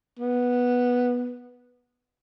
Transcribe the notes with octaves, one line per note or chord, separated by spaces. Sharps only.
B3